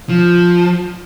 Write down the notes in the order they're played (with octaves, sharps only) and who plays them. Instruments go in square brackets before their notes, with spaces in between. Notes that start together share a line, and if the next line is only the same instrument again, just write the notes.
[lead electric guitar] F3